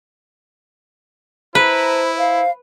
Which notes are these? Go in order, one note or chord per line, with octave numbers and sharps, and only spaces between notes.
E4 B4 C5 A5 A#5
C5 F5